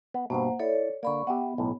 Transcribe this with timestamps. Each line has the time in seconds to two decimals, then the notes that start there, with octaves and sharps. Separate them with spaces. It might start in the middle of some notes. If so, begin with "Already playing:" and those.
0.14 B3
0.30 G2 B2 A#3 C5 F#5
0.59 E4 A4 C#5 D5
1.03 D3 A#3 D5 B5 C#6
1.27 B3 G4 E5 F#5
1.58 B1 A2